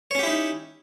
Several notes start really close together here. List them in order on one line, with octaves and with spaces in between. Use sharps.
C#5 C#4 G4 E4 D#4